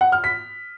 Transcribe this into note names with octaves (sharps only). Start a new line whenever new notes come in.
F#5
F6
B6